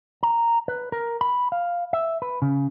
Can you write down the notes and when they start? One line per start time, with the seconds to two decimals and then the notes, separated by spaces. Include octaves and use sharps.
0.23 A#5
0.68 B4
0.92 A#4
1.21 B5
1.52 F5
1.93 E5
2.22 B4
2.42 C#3